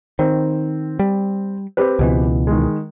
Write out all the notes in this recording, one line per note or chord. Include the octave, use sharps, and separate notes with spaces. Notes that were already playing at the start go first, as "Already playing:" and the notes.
D#3 C4
G3
C4 G4 B4
C#2 B2 E3
D#3 G#3